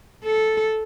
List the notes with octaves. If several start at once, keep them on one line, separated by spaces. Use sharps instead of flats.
A4